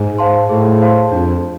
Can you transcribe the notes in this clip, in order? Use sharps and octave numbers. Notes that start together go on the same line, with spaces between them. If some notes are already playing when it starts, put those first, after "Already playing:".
Already playing: G#2 G#4
C5 F5 A5 C6
A2 G#4
C5 F5 A5 C6
F2 D4